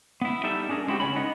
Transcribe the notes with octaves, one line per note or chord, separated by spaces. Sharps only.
B3 E4
G3 D#4 A4 E5
C#4 D4 G#4 A#4
G3 G#3 C4 E4 F#4 G4
C#2 C#4 C#5 B5
B3 D#4 D#5 F#5